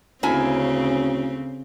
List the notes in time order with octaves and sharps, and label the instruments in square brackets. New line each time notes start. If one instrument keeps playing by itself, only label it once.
[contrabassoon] D2 [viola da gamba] C#3 C4 [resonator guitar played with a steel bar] A#3 E4 G#5 [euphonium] C#4